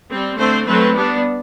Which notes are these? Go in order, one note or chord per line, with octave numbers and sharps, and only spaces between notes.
G3 C4
D3 A3 C4 C5
F#3 A3 C4 B4
G3 B3 D4